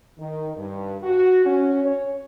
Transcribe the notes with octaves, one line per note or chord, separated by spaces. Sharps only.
D#3
G2
F#4
C#4
C#5